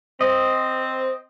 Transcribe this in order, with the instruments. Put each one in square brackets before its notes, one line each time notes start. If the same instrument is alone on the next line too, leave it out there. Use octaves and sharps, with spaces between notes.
[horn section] C4 [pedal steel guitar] D#5